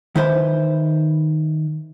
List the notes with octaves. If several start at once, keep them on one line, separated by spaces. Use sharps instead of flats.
D#3 E4 B4 C5